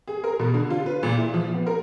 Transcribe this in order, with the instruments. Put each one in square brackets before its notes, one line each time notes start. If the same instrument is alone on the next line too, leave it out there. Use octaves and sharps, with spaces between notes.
[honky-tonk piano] G#4
A#4
B2
D3
F4
B4
A#2
E4
F3
B3
A#4